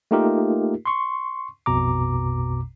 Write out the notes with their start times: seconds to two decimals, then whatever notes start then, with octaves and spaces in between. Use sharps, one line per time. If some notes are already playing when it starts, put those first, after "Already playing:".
0.11 A3 A#3 D#4 F4 G4 A#4
0.85 C6 C#6
1.66 A#1 F2 B2 A#5 D6